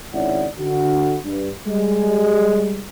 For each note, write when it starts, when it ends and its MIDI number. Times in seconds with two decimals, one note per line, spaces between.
0.13 0.46 32
0.13 0.46 37
0.13 0.46 61
0.13 0.46 64
0.13 0.46 74
0.13 0.46 78
0.59 1.17 50
0.59 1.17 66
1.24 1.51 43
1.67 2.85 55
1.67 2.85 56